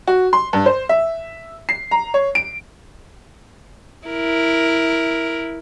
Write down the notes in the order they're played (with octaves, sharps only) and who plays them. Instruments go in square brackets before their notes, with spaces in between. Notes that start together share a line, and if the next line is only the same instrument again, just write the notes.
[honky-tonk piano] F#4
C6
G2
C5
E5
C7
A#5
C#5
D7
[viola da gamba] E4 A#4